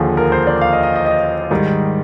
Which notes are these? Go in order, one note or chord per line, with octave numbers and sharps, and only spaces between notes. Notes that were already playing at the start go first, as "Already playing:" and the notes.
Already playing: D#2 D3 F3 G#4
A#4
C5
D5
F5
D#5
D#5
D#5
D#5
G#2 D#3 G3